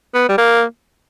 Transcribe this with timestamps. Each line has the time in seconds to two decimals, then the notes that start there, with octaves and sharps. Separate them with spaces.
0.14 B3
0.29 G3
0.38 A#3